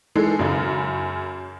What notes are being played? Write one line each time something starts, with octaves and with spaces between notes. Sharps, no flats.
D#3 E3 G#3 A4
F#2 C#3